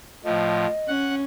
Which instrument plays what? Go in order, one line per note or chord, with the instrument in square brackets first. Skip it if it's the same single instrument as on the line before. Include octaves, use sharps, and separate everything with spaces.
[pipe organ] A2 F3 [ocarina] D#5
[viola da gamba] C#4 [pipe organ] F#5